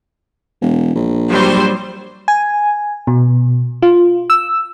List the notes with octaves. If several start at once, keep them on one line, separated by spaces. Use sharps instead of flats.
E1
A#1
F#3 G3 C5
G#5
B2
F4
E6